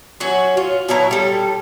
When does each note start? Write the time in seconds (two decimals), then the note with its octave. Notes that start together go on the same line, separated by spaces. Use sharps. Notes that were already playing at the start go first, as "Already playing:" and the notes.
0.20 F#3 C#4 F#4
0.57 F4
0.89 B2 F#3 E4 A#5
1.11 G3 A4